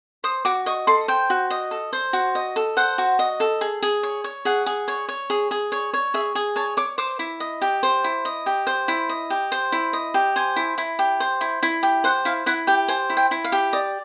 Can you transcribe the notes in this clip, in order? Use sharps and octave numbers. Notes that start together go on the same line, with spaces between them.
C5 D#6
F#4 D6
D#5 C#6
A4 C6
C5 G5
F#4
D#5
A4
C5
F#4
D#5
A4
C5 F#5
F#4
D#5
A4
G#4
G#4
C#5
C#5
G#4 F#5
G#4
C#5
C#5
G#4
G#4
C#5
C#5
G#4 E5
G#4
C#5 A5
C#5 D6
C5 D6
E4
D#5
G4
C5
E4
D#5
G4
C5
E4
D#5
G4
C5
E4
D#5
G4
C5 G#5
E4
E4
G4
C5
E4
E4
G4
C5 F#5
E4 F5
E4 F#5
G4 G5
C5 G#5
E4
G5
E4
F5
G4
D5 D#5